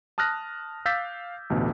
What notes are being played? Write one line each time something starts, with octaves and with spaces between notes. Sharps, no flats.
A5 D#6 F6 F#6 A#6
F5 D6 E6 G6 A6 B6
A1 D2 B2